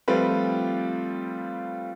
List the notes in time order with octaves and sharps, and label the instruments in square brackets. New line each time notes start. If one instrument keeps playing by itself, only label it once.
[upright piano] F3 G3 A3 C4 F4 B4